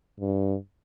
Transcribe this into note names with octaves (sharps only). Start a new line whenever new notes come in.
G2